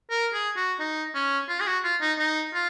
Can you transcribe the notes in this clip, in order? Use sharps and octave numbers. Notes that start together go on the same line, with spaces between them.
A#4
G#4
F#4
D#4
C#4
F4
G#4
F#4
F4
D#4
D#4
F4